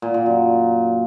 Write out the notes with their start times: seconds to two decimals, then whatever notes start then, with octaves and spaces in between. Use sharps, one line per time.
0.02 A#2
0.14 A#2
0.26 F#2